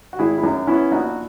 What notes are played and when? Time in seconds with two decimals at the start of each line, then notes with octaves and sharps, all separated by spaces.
0.13 F#4
0.19 G#1 E4 G#4
0.38 E4
0.43 F#2 D#4
0.67 B3 C#4 E4
0.91 A#1 D#4 F#4